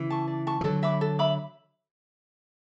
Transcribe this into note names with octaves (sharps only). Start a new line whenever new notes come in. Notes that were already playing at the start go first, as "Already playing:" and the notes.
Already playing: C#3 E3
A5 C#6
D5
A5 C#6
E3
D3 F#3 A4
E5 B5 D6
A4
E5 B5 D6